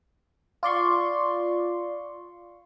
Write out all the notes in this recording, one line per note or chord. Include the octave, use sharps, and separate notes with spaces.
F4 D5 C6 C#6